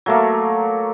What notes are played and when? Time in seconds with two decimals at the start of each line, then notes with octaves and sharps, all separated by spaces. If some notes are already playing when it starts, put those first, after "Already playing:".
0.06 F#3 A3 A#3